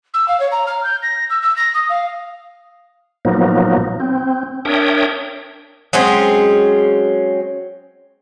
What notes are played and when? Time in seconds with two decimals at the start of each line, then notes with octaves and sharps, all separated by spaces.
0.13 E6
0.28 F5
0.39 C#5
0.51 A#5
0.66 F6
0.83 G6
1.02 A#6
1.29 E6
1.42 E6
1.56 A#6
1.74 D#6
1.89 F5
3.25 A#2 F3 F#3 A#3 B3 D#4
4.00 C4
4.65 D4 A#4 C#5 E5 G5 D#6
5.93 F#3 G#3 C4 C#4